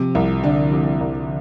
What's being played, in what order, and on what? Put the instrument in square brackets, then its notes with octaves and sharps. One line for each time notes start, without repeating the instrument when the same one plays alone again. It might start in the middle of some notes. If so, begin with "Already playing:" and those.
Already playing: [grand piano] C3 [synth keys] F3
[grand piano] C2 [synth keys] F3
[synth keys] D3 [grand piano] D4
[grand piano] C3 [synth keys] F3
[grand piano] C2